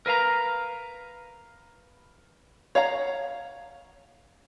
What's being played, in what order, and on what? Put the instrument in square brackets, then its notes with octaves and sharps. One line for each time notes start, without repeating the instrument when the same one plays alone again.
[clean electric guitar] A#4 B4 F5 A#5
[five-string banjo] C#5 F5 F#5 A#5